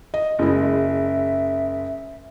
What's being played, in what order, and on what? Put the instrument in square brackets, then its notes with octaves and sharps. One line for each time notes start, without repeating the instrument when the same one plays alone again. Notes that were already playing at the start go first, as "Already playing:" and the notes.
[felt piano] D#5
[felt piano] F#1 G#3 [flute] E4
[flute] E5